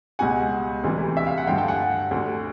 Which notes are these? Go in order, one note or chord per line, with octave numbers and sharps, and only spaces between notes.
C#2 B2 G3 F#5 G#5
D2 C3 E3 G3
E5
F5
F#5
G2 D3 F3 F5 G5
G5 A5
F#5 G#5
D2 D3 G3